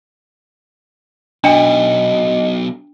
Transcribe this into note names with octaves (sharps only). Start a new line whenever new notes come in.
B1 B2 D4 D#5 G5